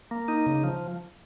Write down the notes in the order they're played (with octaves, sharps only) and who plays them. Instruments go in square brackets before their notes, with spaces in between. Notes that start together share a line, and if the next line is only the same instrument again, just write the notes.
[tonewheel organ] A#3
D#4
C#3
F3